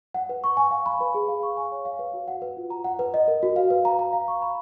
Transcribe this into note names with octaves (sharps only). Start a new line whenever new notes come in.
F#5
B4
C#6
G#5
F5
B5
B4
G#4
F5
C#6
G#5
C#5
F5
B4
F#4
F#5
B4
F4
A#5
F#5
B4
D#5
A#4
F#4
F5
B4
A#5
A#5
F5
C#6
B5